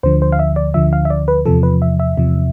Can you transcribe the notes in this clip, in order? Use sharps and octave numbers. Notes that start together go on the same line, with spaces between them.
D2 D3 F3 C5
C5
F5
E5
D5
D2 D3 F3 E5
F5
E5
D5
B4
E2 C3 F3 A4
B4
E5
E5
E2 C3 F3